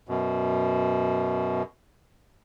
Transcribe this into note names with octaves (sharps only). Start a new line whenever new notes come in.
F#2 B2